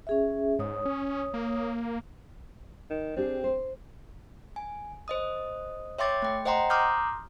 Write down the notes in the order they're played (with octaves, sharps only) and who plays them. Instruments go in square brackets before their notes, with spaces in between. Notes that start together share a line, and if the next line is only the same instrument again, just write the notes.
[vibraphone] C#4 G#4 E5
[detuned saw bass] G#2 [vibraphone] C#5 D#6
[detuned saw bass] C#4
A#3
[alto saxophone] D#3
[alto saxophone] C4 [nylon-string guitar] D4 G4 G#4
[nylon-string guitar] C5
[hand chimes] G#5
C5 D#5 D#6
C#5 E5 G5 C6 D6 A6
A3 G5
C5 D#5 F#5 G5 A#5 C6
A#5 C6 D6 D#6 F6 G6